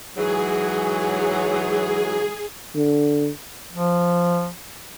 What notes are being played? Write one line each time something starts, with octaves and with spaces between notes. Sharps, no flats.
G#2 E3 F#3 G#4
D3
F3